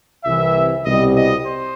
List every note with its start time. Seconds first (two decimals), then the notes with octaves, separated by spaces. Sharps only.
0.24 C2 C3 E3 E5
0.85 C2 B2 G3 D#5
1.16 D#5
1.45 C5